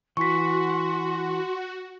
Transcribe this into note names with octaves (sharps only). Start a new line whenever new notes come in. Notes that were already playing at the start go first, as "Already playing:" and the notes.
E3 F#4 C6 C#6 B6